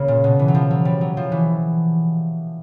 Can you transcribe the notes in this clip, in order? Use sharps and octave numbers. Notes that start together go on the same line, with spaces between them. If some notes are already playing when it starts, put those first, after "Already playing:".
Already playing: C#3 A#3
A#2
B2
E3
F#3
F3
F#3
G3
F#3
F3
E3